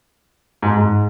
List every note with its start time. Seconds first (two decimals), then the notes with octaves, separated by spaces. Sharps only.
0.62 G#2
0.77 G#2